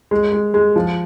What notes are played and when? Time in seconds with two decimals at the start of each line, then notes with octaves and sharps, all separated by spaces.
0.11 G#3
0.32 G#3
0.54 G#3
0.76 F3